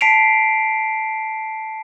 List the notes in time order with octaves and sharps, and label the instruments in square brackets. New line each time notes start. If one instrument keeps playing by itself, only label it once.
[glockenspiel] A5 B6 C7 D7 F7